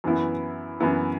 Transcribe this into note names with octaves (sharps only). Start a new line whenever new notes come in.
F#2 E3 B3 E4
F#2 E3 B3 E4